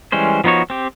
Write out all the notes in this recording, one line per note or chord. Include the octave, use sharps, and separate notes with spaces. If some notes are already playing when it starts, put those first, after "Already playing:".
E3 G3 G#3 C#4 C5
F3 B3 D#4 F#4 C#5
C4 G4